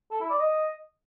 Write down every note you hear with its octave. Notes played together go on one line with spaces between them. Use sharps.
A4
E4
D5
D#5